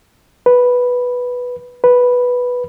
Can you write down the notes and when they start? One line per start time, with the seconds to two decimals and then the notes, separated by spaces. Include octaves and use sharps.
0.46 B4
1.84 B4